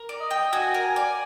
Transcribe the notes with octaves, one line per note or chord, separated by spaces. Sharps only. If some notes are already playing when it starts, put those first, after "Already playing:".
Already playing: A#4
D5
D#5
G5
F#4 G#5
A#4
G#5
D5